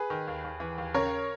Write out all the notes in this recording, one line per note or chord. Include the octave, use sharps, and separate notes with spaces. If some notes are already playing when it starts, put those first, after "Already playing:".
Already playing: G#4 B4
D#3
D#2
D#2
E3
D#2
C#3 A#4 C#5